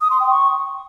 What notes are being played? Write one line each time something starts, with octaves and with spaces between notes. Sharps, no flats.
D#6
C6
G5
C#6